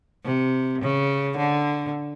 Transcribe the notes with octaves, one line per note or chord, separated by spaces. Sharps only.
C3
C#3
D3